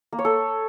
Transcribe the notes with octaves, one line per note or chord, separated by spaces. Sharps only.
A#3
C#5
A4